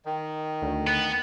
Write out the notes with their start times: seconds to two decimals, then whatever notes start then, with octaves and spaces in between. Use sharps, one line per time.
0.05 D#3
0.62 D2
0.87 B3